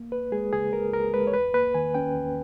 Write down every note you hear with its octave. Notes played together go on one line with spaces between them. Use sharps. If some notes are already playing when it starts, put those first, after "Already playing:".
Already playing: A#3
C#2 B4
G#3 G#4
C#3 G#4
C#2 A#4
C#2 A#4
G#3 B4
C#5
E2 B4
A#3 B4
D#3 G#5
C#4 G5
E2